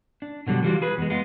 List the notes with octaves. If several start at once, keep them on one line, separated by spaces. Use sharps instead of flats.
D4
B2 D3 F#3 G3
E3 G3 F4 F#4
G#4 B4
E2 G#3
G#3 B3 F4